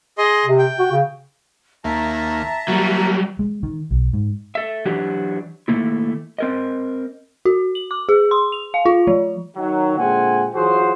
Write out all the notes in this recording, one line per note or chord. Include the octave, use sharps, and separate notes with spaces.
G#4 D#5 C6
C3
G5
F#4
C#3
D#2 A#3 E5 A5 A#5
E3 F#3 G3 A#3
G#3
D#3
B1
G#2
A4 E5
E3 F#3 D4 F#4 G4
D#3 A3 A#3 E4
C4 A#4 D#5
F#4
F#7
D6
G#4
C6
F7
F5
F4
F3
D#3 F#3
A#2 D3 G#3 C4 F#5 G#5
E3 F#3 F4 F#4 G#4 C5